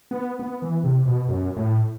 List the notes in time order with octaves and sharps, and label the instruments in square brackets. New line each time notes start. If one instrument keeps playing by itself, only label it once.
[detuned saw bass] B3
B3
E3
C3
B2
F#2
A2